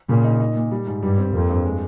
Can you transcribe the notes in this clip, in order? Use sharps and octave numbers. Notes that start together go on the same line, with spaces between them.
A#2 C#3
D#4
D#4
A#2
G3
G#2
G2 G3
C4
F2 A#3
G2
G#3